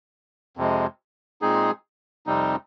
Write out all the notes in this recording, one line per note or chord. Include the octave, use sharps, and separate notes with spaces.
F2 C3 F3 G#3
A#2 G#3 C4 D#4 G#4
F2 C3 G3 C4 D#4